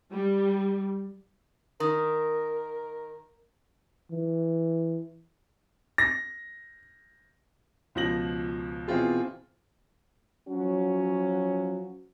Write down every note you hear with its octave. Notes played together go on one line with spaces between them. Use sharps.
G3
D#3 A#4
E3
A#6
C#2 B2 F3 A#6 F#7
B2 E3 C4 F4 G#4
F3 F#3 C#4 F#4